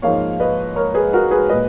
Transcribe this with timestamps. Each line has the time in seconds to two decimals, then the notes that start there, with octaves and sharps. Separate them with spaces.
0.02 G#2 F3 A#3 C#5 F5
0.40 B4 D#5
0.76 A#4 C#5
0.94 G#4 B4
1.13 F#4 A#4
1.31 G#4 B4
1.49 A#2 G#3 B4 D#5